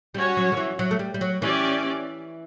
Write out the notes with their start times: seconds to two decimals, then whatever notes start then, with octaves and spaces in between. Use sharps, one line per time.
0.14 G3 C#4 F#4 C#5
0.37 F#3
0.52 D3
0.57 E3
0.79 F#3
0.91 A3
0.99 G3
1.14 G3
1.21 F#3
1.42 E3 C#4 G4 D5